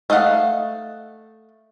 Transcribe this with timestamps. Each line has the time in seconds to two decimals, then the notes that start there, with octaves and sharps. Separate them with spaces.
0.10 A3 D#5 F5 F#5